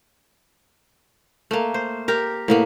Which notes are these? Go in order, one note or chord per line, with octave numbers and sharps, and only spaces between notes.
A3 A#3
C5
G4 A#4
A2 A#3 B3